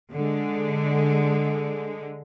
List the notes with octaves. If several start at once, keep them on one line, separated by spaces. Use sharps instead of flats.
D3 G#3